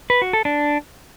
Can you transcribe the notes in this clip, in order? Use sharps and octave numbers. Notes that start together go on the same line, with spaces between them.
B4
F#4
A4
D4